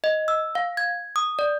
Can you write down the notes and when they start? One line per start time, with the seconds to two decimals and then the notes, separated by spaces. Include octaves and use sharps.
0.04 D#5
0.28 E6
0.55 F5
0.77 G#6
1.16 D#6
1.39 D5